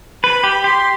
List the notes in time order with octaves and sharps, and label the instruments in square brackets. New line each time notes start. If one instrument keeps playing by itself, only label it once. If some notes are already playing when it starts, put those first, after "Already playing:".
[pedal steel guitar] B4 [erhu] B5
[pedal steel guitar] G4
[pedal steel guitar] G4 [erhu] C6